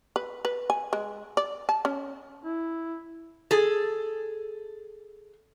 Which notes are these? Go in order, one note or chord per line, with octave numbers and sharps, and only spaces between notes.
B4
B4
G#5
G#3
D5
A5
C#4
E4
G#4 A4